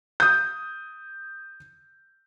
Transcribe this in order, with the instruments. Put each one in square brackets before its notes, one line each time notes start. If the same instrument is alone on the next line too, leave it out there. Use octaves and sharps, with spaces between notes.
[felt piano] D#6 G6